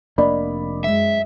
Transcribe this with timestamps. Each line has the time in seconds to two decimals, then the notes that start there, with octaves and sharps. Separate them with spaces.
0.18 F1 A#3 D4 D5 D#5 B5
0.84 F#2 G#3 E5